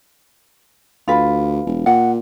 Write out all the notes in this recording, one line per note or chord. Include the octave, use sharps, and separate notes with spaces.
D2 F4 B4
E1
A#2 F#5